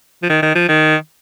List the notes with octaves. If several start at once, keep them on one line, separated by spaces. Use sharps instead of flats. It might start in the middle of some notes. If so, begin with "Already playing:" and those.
F3
D#3
D#3
F3
D#3